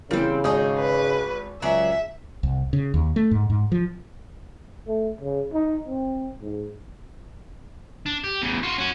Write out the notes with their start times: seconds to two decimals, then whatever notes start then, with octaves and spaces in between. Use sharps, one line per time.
0.11 C#3 E3 G3 A#3 C4
0.44 G#1 D#4 G#4 D#5 D#6
0.79 B4
1.62 C#2 F#3 G#4 D5 E5
2.43 C2
2.73 C#3
2.94 D#2
3.16 A3
3.31 G#2
3.50 G#2
3.72 F3
4.87 A3
5.21 C#3
5.53 D#4
5.88 C4
6.42 G#2
8.06 D4
8.24 G4
8.42 E2 C#3
8.63 F4 F#4
8.78 C#4 F#4